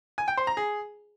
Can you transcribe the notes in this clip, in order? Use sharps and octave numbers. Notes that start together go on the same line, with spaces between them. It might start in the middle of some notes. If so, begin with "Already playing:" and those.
G#5
G5
C5
A#5
G#4